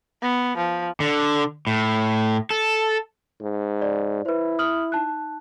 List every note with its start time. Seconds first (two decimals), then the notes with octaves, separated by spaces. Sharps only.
0.22 B3
0.57 F3
1.00 D3
1.67 A2
2.50 A4
3.41 G#2
3.82 D5
4.26 E4 B4 C5
4.59 D#6 F6 F#7
4.92 D#4 A5 F#6